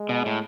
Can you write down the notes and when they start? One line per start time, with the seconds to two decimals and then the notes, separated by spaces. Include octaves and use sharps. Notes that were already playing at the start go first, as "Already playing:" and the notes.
Already playing: G#3
0.09 B2
0.26 A2